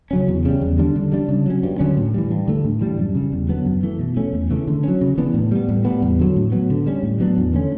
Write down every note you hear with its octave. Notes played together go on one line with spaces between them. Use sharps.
C#3 F#3 C#4
E2
C#3 G3
E2
D3 G3 D4
D3
G3 D4
C#3
F#3 C#4
G2
D3 F#3 C#4
A2
E3 G3
G2
D3 A3
A2
E3 G3 D4
F#2
C#3 G3
E2
D3 F#3 B3
F#2
E3 A3
B2
A3 C#4
E2
C#3 E3 A3
D3
F#3 C#4
C#3
E3 B3 D4
A2
G3 B3
A2
G3 B3
E2
D3 F#3
A2
F#3 B3
D3
G3 C#4
A2
F#3 B3 D4
E2
D3 A3 C#4